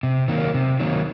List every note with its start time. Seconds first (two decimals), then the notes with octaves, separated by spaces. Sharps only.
0.03 C3
0.28 D#3 F#3 A#3
0.54 C3
0.80 D#3 F#3 A#3